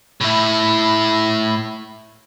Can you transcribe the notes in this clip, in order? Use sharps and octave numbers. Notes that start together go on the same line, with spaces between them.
A2 E4